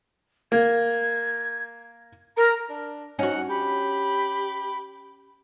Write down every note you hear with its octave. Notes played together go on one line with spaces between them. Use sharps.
A#3 G#6
A#4 A#5
D4
C#4 D#4 F#4 F#5
G4 B5